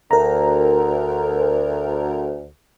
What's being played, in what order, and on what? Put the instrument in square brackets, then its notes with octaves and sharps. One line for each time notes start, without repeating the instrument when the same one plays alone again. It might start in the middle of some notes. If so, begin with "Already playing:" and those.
[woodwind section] D2 [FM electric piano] A#4 A#5